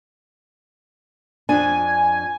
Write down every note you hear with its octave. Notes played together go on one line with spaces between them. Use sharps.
F2 D4 G#5